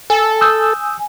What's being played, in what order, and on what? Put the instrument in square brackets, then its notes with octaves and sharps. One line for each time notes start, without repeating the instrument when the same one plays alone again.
[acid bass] A4 [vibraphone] G#5
[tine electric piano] D#6 E6 G6